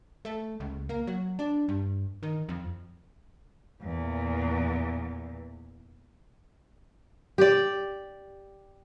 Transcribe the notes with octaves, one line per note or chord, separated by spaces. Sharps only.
A3
C#2
A#3
F#3
D4
G2
D#3
F2
E2 A#2
G4 D5